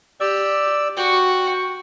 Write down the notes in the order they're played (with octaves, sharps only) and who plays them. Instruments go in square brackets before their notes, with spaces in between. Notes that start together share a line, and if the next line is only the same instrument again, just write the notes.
[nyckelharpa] G4 [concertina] D5 E6
[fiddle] F#4 [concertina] G5 [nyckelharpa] C#6